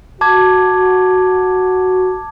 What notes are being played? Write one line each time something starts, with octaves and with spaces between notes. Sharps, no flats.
F#4 A5 D6 G#6